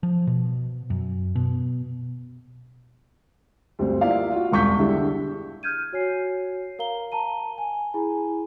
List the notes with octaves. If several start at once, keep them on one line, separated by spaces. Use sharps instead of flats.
F3
B2
F#2
B2
D2 G2 G3 C4
A#3 E4 F4 D5 F5
F4 F#4
E1 C2 C#6 G6 B6
D3 G3 G#3 D4 E4 G4
F6 G6 G#6 D#7
F#4 C#5 G#5 C7
A#4 F5 A#5 G7
A5 A#5 D#7
G#5
E4 G#4 G#5 A#5 B5